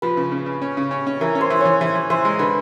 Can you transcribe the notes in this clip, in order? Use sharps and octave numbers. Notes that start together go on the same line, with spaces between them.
F3 B4
C#3
C#3
C#3
C#4
C#3
C#4
C#4
E3 A#4
C#4
C5
E3
E3 C#5
E3 C5
E3
E3 C5
G#3
D3 B4